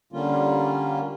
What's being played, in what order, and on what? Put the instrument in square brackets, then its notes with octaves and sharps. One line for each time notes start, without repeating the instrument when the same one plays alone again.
[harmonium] D3 G3 A#3 C#4 F4